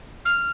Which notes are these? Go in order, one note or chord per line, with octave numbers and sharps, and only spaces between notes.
F6